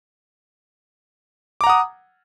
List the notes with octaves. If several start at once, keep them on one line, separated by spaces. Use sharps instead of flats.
F#5 A#5 D6 D#6